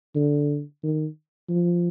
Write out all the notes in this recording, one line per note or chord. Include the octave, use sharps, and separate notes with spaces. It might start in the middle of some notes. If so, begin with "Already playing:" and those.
D3
D#3
F3